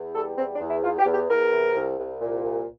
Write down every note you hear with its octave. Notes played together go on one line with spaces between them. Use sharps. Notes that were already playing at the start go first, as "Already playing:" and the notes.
Already playing: E2
G3 A4
E2 C4
D4
E2
E4
E2 F4
G4
E2
G4
E2 A#4
C3
C2
C2
A#2
C2